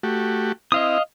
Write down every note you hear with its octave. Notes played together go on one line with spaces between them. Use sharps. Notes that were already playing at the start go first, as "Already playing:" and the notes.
A3 F#4 G4
C4 E4 D#5 F5 D#6